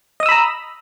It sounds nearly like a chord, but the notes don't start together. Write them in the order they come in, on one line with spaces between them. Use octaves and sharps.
D#5 D#6 E6 B5 A#5